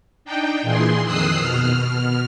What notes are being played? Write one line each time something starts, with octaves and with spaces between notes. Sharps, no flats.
D4 D#4 G5
A#2 E3 G#4 C6
F2 D#3 D#6 E6 F#6 C7
B2 F6